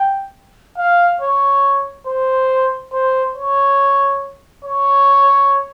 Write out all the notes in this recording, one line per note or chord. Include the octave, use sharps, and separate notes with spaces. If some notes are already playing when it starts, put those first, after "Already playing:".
Already playing: G5
F5
C#5
C5
C5
C#5
C#5